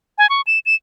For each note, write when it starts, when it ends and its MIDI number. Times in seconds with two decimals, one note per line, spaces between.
0.18 0.29 80
0.30 0.41 85
0.47 0.59 100
0.66 0.75 100